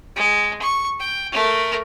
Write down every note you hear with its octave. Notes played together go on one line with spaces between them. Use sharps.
G#3
C#6
G5
A3 A#4